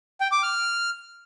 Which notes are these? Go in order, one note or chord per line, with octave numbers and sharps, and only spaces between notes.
G5
D6
F6